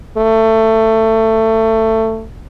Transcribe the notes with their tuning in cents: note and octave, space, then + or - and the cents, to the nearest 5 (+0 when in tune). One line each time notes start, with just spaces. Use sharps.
A3 +20